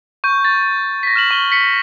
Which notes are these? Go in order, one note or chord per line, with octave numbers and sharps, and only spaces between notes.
C#6 G6
A6
A#6 B6
F6 E7 F#7
C#6 G7
B6 C#7